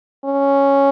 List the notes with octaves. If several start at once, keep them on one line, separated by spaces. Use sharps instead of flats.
C#4